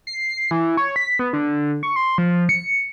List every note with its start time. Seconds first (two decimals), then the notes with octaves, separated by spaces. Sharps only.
0.07 C7
0.51 E3
0.77 C#5
0.96 B6
1.19 B3
1.33 D3
1.83 C#6
1.96 C6
2.18 F3
2.49 C#7